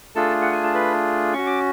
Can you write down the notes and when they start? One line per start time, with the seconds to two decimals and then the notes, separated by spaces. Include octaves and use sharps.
0.15 A3 D4 F4 G#4 A4 A5
0.42 F#5
0.52 G#5
0.64 A5
0.74 B4 B5
1.33 C#4 F#4 C#6
1.46 D6